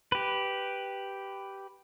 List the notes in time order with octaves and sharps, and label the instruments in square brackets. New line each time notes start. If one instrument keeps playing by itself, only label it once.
[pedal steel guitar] G4 B4